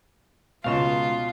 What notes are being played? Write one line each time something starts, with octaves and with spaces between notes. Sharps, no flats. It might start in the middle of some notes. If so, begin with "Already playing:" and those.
C#2 B2 F4 F5 C#6 E7